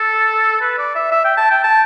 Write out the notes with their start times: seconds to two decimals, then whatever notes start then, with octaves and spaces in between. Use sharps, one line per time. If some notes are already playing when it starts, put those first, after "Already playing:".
Already playing: A4
0.61 B4
0.78 D5
0.95 E5
1.11 E5
1.24 G5
1.37 A5
1.50 G5
1.64 A5